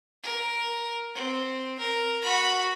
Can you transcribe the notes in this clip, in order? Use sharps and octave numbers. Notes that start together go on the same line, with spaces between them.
A#4
C4
A#4
F#4 B5